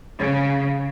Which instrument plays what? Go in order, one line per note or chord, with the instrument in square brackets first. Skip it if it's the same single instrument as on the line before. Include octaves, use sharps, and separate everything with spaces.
[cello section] C#3